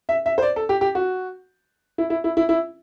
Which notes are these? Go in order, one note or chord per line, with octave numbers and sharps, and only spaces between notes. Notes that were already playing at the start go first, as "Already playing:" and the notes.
E5
E5
C5
D5
A4
G4
G4
F#4
E4
E4
E4
E4
E4